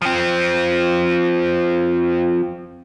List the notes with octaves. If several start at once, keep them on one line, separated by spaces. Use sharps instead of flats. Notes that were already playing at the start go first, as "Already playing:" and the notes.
F3 C4